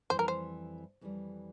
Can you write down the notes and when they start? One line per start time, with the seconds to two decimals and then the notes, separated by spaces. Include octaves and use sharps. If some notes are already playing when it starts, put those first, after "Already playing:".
0.10 F2 E3 G3 C5
0.19 A#4
0.28 C5
1.01 F2 E3 G3